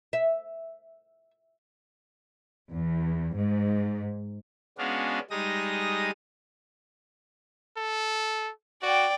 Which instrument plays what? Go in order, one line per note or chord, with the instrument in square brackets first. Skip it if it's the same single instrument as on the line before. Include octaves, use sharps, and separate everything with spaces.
[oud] E5
[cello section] E2
G#2
[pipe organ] G#3 B3 C#4 D4 F#4 F5
G3 G#3 D#4 D#6 A#6
[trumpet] A4
[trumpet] F#4 [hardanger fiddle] D5 G5